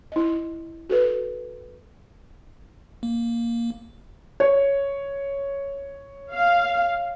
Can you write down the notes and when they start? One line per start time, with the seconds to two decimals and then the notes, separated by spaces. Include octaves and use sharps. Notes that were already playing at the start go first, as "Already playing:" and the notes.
0.12 E4 D#5
0.90 F#4 A4 B4
3.03 A#3
4.40 C#5
6.33 F5